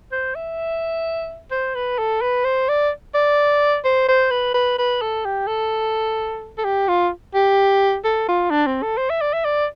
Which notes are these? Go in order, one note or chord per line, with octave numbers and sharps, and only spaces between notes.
C5
E5
C5
B4
A4
B4
C5
D5
D5
C5
C5
B4
B4
B4
A4
G4
A4
A4
G4
F4
G4
A4
F4
D4
C4
A4
C5
E5
D5
E5
D5